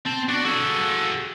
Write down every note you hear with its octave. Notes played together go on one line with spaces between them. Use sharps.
C4 A5
D4 F#4 D5
F#4 G#4 A4